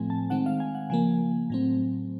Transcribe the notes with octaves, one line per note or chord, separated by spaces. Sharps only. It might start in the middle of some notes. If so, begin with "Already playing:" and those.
Already playing: A2 F3 A3 C4 G#5
A5
D#3 G#3 C4 F#5
F5
G#5
F#5
C#3 F3 A#3 G#5
A2 F#3 A3 C4